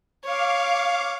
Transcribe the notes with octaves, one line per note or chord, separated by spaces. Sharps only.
C#5 F5 D6